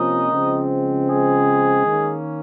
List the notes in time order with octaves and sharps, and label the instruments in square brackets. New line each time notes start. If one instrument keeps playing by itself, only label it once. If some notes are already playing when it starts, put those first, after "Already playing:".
Already playing: [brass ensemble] C3 F3 A#3 C#4 D#4 D#5
C#3 F3 G#3 C4
G#3 G#4
D#3 A#3 C#4